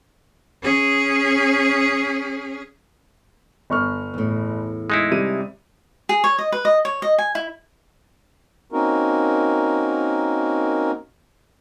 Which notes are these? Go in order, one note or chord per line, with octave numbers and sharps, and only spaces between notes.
C#4 G#4
G1 C#6 F6
E2 A2
G#3 D#4 E4
C3 G3 D#7
G#4
C#5
D#5
B4
D#5
C#5
D#5
G#5
E4
A#3 C4 C#4 D#4 F#4 A#4